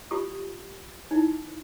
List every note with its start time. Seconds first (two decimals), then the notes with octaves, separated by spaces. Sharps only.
0.11 F4 G4 C#6 D#6
1.11 D#4 E4